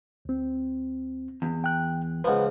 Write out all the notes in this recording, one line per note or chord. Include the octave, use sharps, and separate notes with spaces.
D2 C4
E2
G5 F#6
C#2 F3 B4 F#5